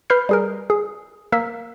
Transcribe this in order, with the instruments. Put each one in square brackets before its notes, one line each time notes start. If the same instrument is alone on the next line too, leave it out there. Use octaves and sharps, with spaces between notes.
[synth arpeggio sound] B4 B5 F6 G6 C7
G3 G#4 A#4
G#4
A#3 A#4 E6 B6